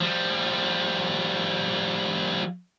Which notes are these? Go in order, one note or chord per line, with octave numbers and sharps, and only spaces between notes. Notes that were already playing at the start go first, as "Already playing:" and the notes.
F3 G3